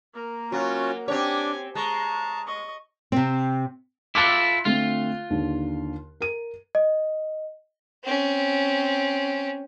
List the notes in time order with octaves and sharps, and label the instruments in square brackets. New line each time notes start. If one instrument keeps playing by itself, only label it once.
[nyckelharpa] A#3 A#4
[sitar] F#3 [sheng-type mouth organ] C#4 F4 F#4
[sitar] C4 C#5 [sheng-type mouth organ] D4 [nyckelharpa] G4 G#5
[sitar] G#3 [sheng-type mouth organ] A5 [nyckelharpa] A#5 C#6
[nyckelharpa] D#5 C#6
[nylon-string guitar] C3 C4
[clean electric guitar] E4 F4 A4 [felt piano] D6 F#6
[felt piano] D3 A3 C4 [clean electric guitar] F4
[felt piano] D#2 D3
A#4 D#7
[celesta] D#5
[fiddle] C4 C#4